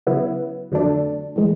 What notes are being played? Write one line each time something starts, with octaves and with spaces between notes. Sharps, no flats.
C#3 F#3 B3 E4
F2 D3 F#3 A3 D4
A2 E3 G#3